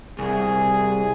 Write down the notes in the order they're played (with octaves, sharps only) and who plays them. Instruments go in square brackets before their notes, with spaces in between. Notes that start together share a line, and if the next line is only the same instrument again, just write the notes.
[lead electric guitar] C2 [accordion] G#4